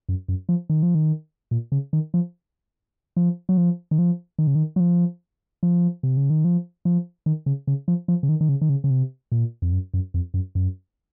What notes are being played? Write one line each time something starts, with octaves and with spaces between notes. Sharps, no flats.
F#2
F#2
F3
D#3
F3
D#3
A#2
C#3
D#3
F3
F3
F#3
F3
D#3
F3
D#3
C#3
D#3
F#3
F3
F3
C3
C#3
D#3
F3
F3
D#3
C#3
C#3
F3
F3
C#3
D#3
D#3
C#3
D#3
C#3
C#3
C3
A#2
F2
F#2
F#2
F2
F#2
F#2